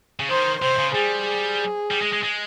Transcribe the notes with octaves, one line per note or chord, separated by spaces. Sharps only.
C#3
D#3 C5
C3 C5
C#3
G3 G#4
G#4
G3
G#3
G#3
G#3